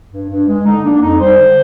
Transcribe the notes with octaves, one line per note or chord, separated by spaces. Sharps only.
G2
G2
G#3
D3 D#4
A#3 D4
D4
F2 D#4
G3 C5
D3